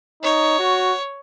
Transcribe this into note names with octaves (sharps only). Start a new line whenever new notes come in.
D#4 C#5
F#4